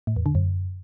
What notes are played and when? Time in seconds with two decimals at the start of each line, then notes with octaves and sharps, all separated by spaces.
0.07 A2
0.16 E2
0.26 D3
0.35 F#2